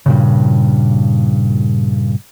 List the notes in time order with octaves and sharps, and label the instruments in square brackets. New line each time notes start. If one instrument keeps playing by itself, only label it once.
[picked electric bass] G2 A#2 C#3